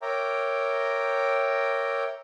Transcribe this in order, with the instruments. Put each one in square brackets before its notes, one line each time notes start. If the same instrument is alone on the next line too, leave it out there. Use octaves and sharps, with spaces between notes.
[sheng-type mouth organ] A#4 C#5 E5 G5 A#5 D6